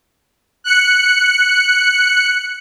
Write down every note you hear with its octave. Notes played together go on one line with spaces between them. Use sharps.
F#6 C#7